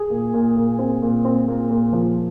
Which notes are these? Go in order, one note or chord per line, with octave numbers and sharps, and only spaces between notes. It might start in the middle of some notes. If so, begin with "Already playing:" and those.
Already playing: G#4
A#2
A#2
A#2
C4
A#2
C4
A#2
A#2
F3